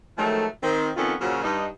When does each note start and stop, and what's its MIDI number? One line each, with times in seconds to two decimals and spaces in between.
0.18 0.45 51
0.18 0.45 53
0.18 0.45 54
0.18 0.45 56
0.18 0.45 57
0.62 0.90 51
0.62 0.90 60
0.97 1.14 41
0.97 1.14 51
0.97 1.14 59
0.97 1.14 61
0.97 1.14 65
0.97 1.14 69
1.21 1.41 46
1.21 1.41 49
1.21 1.41 53
1.21 1.41 54
1.43 1.66 43
1.43 1.66 63